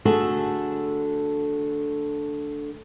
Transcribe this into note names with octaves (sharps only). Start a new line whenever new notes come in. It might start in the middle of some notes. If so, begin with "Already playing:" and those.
D3 A3 F#4 G#4 A4